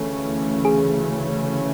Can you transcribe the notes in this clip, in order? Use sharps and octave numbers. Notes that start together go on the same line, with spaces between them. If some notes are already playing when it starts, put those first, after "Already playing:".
Already playing: D2 C#3 E3 A3 C#4 A4
G#4